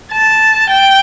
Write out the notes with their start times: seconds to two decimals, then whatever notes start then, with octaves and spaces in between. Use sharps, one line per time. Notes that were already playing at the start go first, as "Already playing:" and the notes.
0.12 A5
0.70 G5